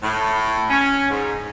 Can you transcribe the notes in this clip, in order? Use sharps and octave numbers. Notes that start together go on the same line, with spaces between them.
A2
C#4
G#2